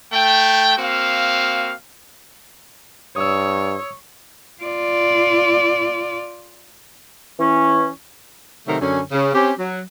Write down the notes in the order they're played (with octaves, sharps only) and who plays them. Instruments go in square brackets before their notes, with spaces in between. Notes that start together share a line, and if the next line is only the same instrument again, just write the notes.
[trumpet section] A3 G5
A#3 C4 F#4 F5
[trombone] G2 [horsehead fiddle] C#5 [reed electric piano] D#6 E6
[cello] F4 D5
[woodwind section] E3 C#4
[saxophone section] C3 D#3 F#3 A3 A#4
F#2 D3 C#4
C#3
C4 C#4 G4
F#3